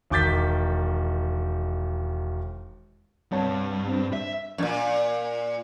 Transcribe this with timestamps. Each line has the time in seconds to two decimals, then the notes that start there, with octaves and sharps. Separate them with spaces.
0.10 E1 D#3 D6 G6 A6 B6
3.31 C2 G2 C#5 A5
3.87 C4 D4
4.13 E5
4.58 F#2 A#2